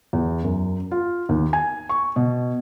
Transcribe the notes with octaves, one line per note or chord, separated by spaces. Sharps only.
E2
F#2
F4
D#2
G#5
C#6
B2